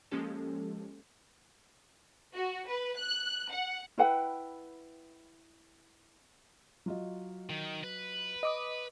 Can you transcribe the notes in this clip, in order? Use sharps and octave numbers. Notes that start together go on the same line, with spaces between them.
F3 G#3 A#3 C#4 G4 A4
F#4
B4
F#6
F#5
E4 B4 F#5 G5
F#3 F4 D#5
D#3
B4
D#5 D6 D#6